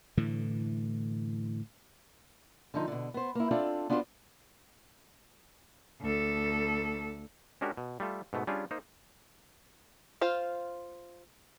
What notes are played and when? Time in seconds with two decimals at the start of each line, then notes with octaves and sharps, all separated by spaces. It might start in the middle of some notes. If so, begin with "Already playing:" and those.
0.17 A2 D3 E3
2.74 D3 F3 D#4
2.88 B2 D3
3.14 B3 C5
3.35 A#3 E4
3.51 C4 D4 F4 A4 D5
3.90 B3 D4 F4 F#4 G#4 C5
6.02 D2 A4
7.61 G#3 C#4 D4 F#4 G4 A#4
7.77 B2
8.00 G3 A3 F4 A4
8.33 G#2 B2 A3 B3
8.47 G3 C#4 D4 F4 G4 G#4
8.71 A#3 D#4 C5
10.21 F4 C5 F5